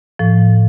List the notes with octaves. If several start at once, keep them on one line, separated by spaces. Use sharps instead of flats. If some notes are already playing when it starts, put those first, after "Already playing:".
A2 F3